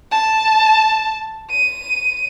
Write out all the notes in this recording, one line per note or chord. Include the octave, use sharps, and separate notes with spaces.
A5
D#7